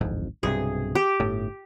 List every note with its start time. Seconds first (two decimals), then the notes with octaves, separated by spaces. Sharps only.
0.01 D1 G#1 F2
0.43 B1 G2 C3 G#4
0.95 G4
1.20 G1 A2